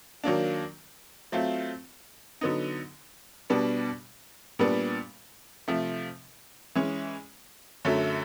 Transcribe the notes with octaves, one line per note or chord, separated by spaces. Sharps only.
D#3 F#3 A#3 D4
F#3 A3 C4 F4
D3 F#3 B3 D#4
B2 G3 B3 D4
A#2 G3 B3 D4
C3 F3 A3
E3 G#3 C#4
F#2 D3 F#3 A3